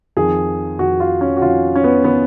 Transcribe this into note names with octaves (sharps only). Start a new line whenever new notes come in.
F2 D#3 G#4
F2 D#3 F#4
F4
C#4
F#4
F2 D#3 F4
C#4
B3
D#3 B3